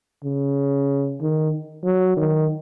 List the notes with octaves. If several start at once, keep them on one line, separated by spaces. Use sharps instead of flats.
C#3
D#3
F#3
D#3